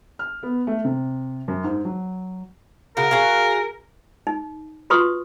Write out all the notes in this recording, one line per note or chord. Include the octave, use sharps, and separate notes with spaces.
F6
B3
A3
C3
F#2
G#2
F#3
C#3 F#4 A#4
F#4 G#4 F5
D#4
F4 F#4 B4 C6 C#6 D#6